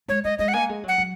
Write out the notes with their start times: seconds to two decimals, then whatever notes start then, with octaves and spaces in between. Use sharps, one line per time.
0.08 G#3 C#5
0.24 G#3 D#5
0.39 G#3 D#5
0.48 F#5
0.54 A#3 G#5
0.69 G#3
0.84 F#3 F#5
0.98 F#3